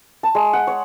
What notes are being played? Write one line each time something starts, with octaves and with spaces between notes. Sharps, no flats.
A5
G#3
F#5
C#5